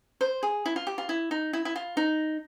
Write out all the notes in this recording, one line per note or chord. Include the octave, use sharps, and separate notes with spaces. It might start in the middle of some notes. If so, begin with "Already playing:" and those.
C5
G#4
E4
F4
G4
F4
E4
D#4
E4
E4
F4
D#4